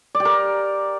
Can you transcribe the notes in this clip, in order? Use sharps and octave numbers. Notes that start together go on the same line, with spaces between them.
D5
G4
A#4